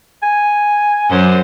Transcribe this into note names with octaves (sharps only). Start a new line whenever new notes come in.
G#5
F#2 C5